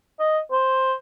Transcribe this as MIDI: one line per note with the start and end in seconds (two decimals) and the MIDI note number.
0.19 0.39 75
0.51 0.95 72